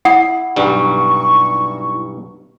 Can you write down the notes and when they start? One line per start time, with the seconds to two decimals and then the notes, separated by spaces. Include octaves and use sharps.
0.05 E4 F#5
0.56 B1 G2 G3 C#6